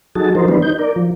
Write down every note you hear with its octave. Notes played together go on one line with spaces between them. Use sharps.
F#3 D#4 F#4 G#4 A4 A5
F3 F#3 D#4 A#4 C5
E3 G3 B3 D4 B4 C5
D#4 G6
A#4 D5
F3